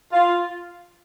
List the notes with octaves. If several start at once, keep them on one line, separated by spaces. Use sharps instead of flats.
F4